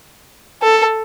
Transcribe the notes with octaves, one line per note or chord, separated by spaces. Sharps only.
A4